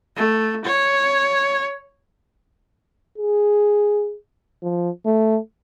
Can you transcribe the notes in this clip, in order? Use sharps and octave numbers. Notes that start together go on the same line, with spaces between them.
A3
C#5
G#4
F3
A3